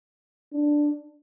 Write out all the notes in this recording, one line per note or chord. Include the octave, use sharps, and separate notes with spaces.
D4